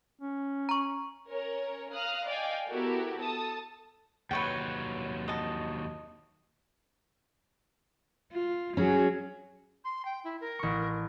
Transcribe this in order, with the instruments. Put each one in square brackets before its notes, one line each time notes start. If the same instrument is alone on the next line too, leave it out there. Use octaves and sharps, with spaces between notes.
[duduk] C#4
[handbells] A#5 C#6
[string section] C#4 A#4 C#5
F5 A#5 D#6 F6 F#6
D5 D#5 F5 G5 G#5
B3 E4 F#4 G4 A4 A#4
A4 A5 D#6
[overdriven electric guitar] D#2 F#3 [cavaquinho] B4 C#5 G5
[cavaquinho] D#5 A5
[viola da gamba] F4
[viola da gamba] F#3 [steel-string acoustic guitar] C#4 G#4
[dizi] C6
G5
E4
A#4
[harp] A1 C#6